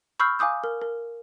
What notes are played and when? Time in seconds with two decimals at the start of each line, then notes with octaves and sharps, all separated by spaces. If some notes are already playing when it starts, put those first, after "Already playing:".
0.20 B5 C#6 E6 F6 G6 C7
0.39 F5 G#5 D6 D#6 G6
0.64 A#4
0.82 A#4